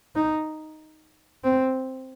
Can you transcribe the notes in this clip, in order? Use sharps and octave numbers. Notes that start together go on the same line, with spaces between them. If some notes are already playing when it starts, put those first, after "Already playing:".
D#4
C4